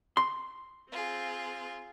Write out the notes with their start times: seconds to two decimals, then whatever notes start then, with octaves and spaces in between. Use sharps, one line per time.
0.17 C6
0.90 C4 F4 G#4